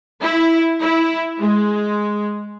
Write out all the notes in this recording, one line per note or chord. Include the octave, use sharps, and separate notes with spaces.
E4
E4
G#3